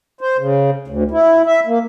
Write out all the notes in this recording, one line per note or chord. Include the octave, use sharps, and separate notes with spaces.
C5
C#3
D2
E4
E5
A#3